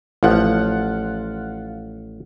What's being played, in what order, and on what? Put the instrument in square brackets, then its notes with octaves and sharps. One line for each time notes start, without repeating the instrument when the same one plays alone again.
[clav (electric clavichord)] A1 F3 [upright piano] F4 F#5